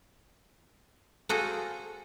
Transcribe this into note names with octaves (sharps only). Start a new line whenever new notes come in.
A#3 C4 F#4 G#4 A4